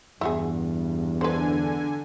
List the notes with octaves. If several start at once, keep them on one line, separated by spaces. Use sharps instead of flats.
E2 G2 E4 F#4 G#4
D3 B4 C5 G#5